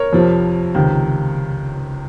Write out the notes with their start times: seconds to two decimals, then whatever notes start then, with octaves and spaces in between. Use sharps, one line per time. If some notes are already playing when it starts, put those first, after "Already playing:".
Already playing: A#4 C#5
0.13 F2 C3 F3
0.75 C#2 C3 D#3